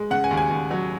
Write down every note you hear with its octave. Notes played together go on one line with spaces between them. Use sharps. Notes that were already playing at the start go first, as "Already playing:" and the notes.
Already playing: G#3
C#3 F#5
G#5
D#2
G#5
D#2
F#3